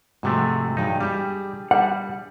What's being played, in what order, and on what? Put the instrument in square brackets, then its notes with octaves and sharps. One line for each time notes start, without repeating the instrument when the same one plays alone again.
[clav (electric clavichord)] G#2 C3 A3 [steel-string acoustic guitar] F3 G#3 F#4
[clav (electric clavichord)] G2 D#4 [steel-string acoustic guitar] F#3 G#3
[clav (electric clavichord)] G3 [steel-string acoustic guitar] D4 G4 G#4
[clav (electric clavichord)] G3 [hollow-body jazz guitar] F#5